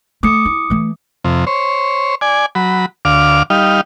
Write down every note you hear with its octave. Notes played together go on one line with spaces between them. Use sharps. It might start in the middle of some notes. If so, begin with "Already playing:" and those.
A3 D6 D#6 C#7
E4
E3 A3
F2 C3
C5 C#5
D5 G#5
F#3 B5
D2 F5 D6
G3 D#4 F5